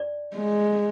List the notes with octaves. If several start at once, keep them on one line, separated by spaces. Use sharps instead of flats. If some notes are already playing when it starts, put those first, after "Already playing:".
Already playing: D5
G#3